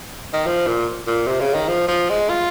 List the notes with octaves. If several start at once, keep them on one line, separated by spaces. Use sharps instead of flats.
D#3
F3
A#2
A#2
C3
C#3
D#3
F3
F3
G#3
F4